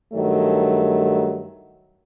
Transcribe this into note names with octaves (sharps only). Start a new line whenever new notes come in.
G2 D#3 F#3 A3